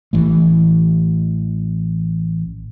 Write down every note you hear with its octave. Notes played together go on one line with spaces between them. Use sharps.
A1 E3 A3